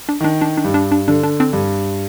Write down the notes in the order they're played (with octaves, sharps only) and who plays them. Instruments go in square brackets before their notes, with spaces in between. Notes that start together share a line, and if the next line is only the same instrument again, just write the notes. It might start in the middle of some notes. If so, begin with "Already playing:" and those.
[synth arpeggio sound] D4
[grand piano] D#3 [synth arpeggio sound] D4
[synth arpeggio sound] D4
D4
[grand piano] G2
[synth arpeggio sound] D4
D4
[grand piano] D3 [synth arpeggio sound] D4
[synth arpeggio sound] D4
C4 D4
[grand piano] G2